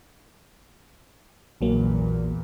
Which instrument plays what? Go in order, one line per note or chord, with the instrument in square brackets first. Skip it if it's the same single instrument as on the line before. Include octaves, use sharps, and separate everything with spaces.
[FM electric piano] A#1 F#3 A#3 [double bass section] E2 A#2